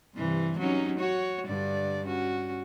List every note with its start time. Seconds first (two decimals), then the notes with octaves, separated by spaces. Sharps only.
0.16 G2 C3 E3
0.59 F#3 C#4 D#4
0.99 F#4 C#5
1.47 G2 D3 D5
2.06 C#4 F#4